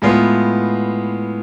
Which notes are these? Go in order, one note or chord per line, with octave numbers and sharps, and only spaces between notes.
A2 G#3 B3 F4